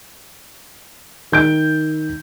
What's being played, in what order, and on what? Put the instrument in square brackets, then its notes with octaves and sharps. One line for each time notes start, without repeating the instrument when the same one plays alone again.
[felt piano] D#3 G6 D7